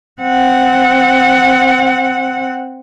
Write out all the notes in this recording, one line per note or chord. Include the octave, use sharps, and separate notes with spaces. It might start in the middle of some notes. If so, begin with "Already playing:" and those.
C4 F#5